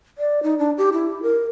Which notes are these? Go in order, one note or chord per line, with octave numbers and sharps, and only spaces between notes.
D5
D#4
D4
G4
E4
A#4